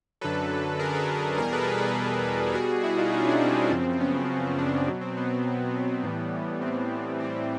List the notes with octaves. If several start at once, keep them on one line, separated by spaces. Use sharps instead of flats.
F#2 D3 F#3 A4 B4
G#4 A#4
A4 B4
E2 B2 G3 G#4 A#4
A4 B4
G#4 A#4
A4 B4
G#4 A#4
A4
B2 G3 F#4 G#4
E4 F#4
D#4 F4
C#4 D#4
D4 E4
C4
F#2 C#3 F3
B3 C#4
C4 D4
B3 C#4
B2 F#3
C4
B3
B3
B3
A2 E3 G3
C4
A2 E3 G3 C4